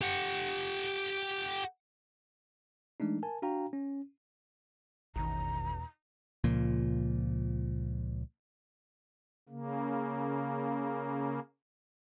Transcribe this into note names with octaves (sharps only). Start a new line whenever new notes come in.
G4 F#5
E3 G#3 A3 D4 D#4
A#4 G#5 A5
D4 F#4 F5 G5 A#5
C#4
E1 A1 E2 B2 D#3 A#5
C#2 A#2 F3
C#3 A#3